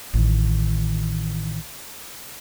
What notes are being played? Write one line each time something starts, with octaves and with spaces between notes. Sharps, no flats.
A1 D#3